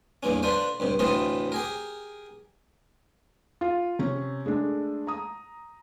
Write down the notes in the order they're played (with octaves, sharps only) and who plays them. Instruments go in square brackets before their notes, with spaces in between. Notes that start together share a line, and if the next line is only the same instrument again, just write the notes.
[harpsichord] E2 G2 A#3 C#4
D3 D4 F4 B4 C5
C#2 G2 C3
D2 A2 C3 E3 F4 D#5
G4 G#4 A#4
[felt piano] F4
C3 C#4
G#3 A3 D4
A#5 D#6